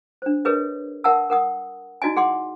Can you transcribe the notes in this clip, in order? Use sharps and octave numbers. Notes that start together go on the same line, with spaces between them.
D4 C5
G#4 A#4 B4 C#5 D#5
A#4 E5 F#5 A5 E6
A#4 F#5 D#6
D#4 E4 F#4 D5 D#5 G#5
G#4 F#5 C6 D6